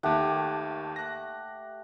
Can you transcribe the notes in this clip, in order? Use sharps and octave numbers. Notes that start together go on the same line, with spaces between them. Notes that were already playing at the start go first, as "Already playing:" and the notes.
D#2 D#3 A3 G4 F#5
F#6 A#6